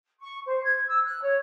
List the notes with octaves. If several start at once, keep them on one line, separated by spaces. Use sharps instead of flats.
C#6
C5
G#6
E6
F#6
C#5